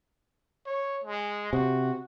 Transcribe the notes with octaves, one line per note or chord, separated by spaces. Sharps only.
C#5
G#3
C3 F#4